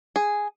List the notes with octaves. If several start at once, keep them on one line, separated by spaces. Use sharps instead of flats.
G#4